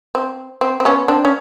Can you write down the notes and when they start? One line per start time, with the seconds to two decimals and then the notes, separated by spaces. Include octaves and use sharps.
0.15 C4
0.61 C4
0.80 C4
0.85 B3 C#4
1.08 C4 D4
1.25 C#4